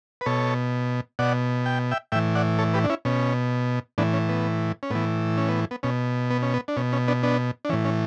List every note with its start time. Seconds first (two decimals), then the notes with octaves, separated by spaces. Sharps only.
0.21 B4
0.26 B2 A4 C#5
1.19 B2 D5 F#5
1.66 G5
1.91 E5 G5
2.12 A2 E3 E5 G5
2.35 D5 F#5
2.59 A4 C#5
2.74 G4 B4
2.84 D4
2.90 C#4 E4
3.05 B2 C#4
3.98 A2 E3 B3 D4
4.13 C#4
4.29 B3
4.83 C#4
4.91 A2 E3 B3
5.38 C#4
5.49 B3
5.71 B3
5.83 B2 C#4
6.31 B3
6.43 C#4
6.54 B3
6.68 D4
6.77 B2 C#4
6.93 C#4
7.08 B3 D4
7.23 B3 D4
7.65 D4
7.69 E3 C#4
7.73 A2
7.85 C#4